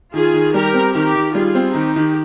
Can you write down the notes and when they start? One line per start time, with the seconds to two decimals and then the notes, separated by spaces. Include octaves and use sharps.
0.13 D#3 F4 G#4
0.34 D#3
0.54 G3 G4 A#4
0.74 C4
0.94 D#3 G4 A#4
1.15 D#3
1.35 G3 F4 G#4
1.55 C4
1.75 D#3 D#4 G4
1.96 D#3